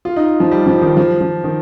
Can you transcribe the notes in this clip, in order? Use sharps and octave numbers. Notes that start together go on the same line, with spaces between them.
F4
D#4
F3
G3
F3
D#3
F3
F3
D#3